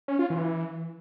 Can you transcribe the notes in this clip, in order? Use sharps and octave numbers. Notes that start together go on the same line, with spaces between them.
C#4
F4
E3